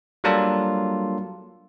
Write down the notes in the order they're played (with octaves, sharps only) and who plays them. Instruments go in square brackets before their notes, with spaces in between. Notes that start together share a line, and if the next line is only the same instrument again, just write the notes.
[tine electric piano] F#3 G3 A#3 D4 F4 A4